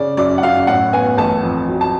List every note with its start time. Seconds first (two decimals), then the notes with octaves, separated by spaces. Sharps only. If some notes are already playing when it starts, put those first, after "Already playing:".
Already playing: C#3 D5
0.17 F#2 D5
0.38 F#5
0.43 F#2 F5
0.67 A2 F#5
0.93 B3 G#5
1.17 A1 A5
1.43 F2
1.68 F#3
1.81 A5